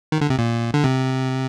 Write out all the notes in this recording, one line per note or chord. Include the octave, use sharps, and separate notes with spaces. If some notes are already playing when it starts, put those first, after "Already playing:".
D#3
D3
C3
A#2
D3
C3